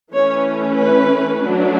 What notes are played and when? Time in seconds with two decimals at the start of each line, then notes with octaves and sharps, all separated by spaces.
0.12 E3 A3 C#4 C#5
0.77 B4
1.43 F#3 A3 D4